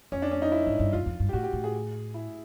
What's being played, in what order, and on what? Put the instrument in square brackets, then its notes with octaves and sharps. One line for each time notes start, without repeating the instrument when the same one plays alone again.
[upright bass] F2 [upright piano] C#4
[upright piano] D4
C#4
D#4
E4
[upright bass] G#2
G2
[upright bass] F#2 [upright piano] F4
[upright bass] F2
G2
[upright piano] G4
[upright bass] A2 [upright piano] F#4
[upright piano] G4
[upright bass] A2
[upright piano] G#4
E4